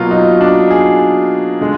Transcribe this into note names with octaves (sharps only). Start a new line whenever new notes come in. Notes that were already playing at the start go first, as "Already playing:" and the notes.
Already playing: B2 F#3 A#3 F4
D#4
D4
G#4
D3 G#3